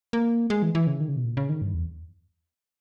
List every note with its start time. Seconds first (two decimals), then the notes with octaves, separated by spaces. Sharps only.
0.13 A#3
0.50 G#3
0.63 E3
0.75 E3
0.87 C#3
1.00 D#3
1.09 C#3
1.16 B2
1.24 A#2
1.37 C#3
1.49 D#3
1.62 G2
1.74 E2